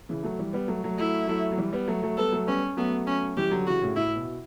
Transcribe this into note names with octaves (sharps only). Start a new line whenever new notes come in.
C#3 E3
F#3 A3
E3 G3
G3 B3
F#3 A3
F#3 A3
F#3 A3 E4
F#3 A3
F#3
E3 G3
G3 B3
F#3 A3
F#3 A3
G3 B3 A4
F#3 A3
G3 B3 C#4
F#3 A3 B3
C#4
E3 G3 G4
D3 F#3
C#3 E3 F#4
A2 C#3
A2 E4
B2